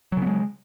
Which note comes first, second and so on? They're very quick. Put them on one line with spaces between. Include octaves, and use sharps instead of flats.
F#3 C#3 B3 G#3